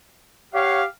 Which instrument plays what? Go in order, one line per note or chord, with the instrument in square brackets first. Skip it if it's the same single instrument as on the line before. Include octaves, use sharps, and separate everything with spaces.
[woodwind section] G4 F5 [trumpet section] C#5 F#5